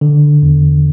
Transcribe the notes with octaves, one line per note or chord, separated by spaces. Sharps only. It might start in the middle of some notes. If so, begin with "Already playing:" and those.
D3
E2